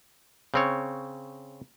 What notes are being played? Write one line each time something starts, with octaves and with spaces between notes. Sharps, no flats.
C#3 C4 C#5